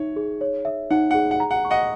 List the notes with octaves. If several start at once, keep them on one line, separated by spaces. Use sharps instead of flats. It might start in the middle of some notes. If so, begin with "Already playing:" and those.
Already playing: D#4 C#5 E5
G#4
C#5
E5
D#4 F#5
G#4 F#5
F#5
A#5
F#5
C#6
D#5 F#5